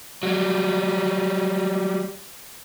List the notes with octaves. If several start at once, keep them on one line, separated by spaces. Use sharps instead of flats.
F#3 G3